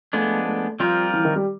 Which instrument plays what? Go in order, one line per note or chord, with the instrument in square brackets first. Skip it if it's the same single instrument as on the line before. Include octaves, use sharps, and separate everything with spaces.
[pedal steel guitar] F3 G#3 B3 D4 [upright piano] A3
[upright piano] A3
[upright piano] F3 [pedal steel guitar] G3 C4 F4 A#4
[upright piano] E3
D#3
G3